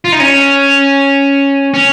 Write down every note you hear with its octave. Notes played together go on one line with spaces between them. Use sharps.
F4
D#4
C#4
C#4